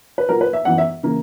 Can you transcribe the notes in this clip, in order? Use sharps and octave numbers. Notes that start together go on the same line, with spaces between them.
B4
A#2 F#3 A#3 A#4
B4
E5
F#2 E3 B3 F#5
E5
C#3 E3 A#3